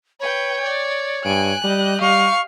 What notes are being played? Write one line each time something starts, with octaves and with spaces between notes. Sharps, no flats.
B4 C#5 G5
D5
G2 G#5 F#6 D7
G3 G4 D#5
G3 F5 C#6